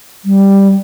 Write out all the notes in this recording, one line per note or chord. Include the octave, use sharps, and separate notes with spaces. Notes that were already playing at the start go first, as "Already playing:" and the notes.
G3